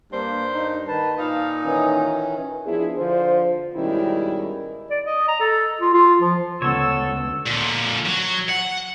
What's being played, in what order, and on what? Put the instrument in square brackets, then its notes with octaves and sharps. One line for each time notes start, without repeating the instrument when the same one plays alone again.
[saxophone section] G2 D4 C5 [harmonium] A#3
[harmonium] D#4
D#3 B4 A5
[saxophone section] A#2 D#4 [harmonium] F5
[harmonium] D#3 E3 C#4
[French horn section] F3 B3 D4 E4 G#4
D3 F3 F4 C5
G#2 B2 D#3 G3 C#4 E4
[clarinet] D5
D#5
A#5
A4
F4
F4
F3
[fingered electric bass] D2 C#3 [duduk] B3 [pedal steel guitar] A4 C#5 [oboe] E6
[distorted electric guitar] A#2 D3
F#3
F#5